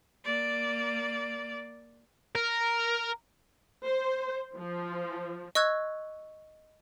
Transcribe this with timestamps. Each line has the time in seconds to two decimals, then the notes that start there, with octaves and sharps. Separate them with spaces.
0.24 A#3 D5
2.35 A#4
3.85 C5
4.57 F3
5.55 D#5 C#6 E6 F#6 G#6